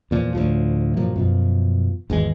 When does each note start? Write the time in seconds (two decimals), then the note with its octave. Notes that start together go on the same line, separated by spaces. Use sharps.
0.11 E2 A#2 F3
0.35 D2 A2 F3
0.97 G2 A#2 F3 F#3
1.16 F#2 B2 F3
2.10 G#1 E2 B2 G#3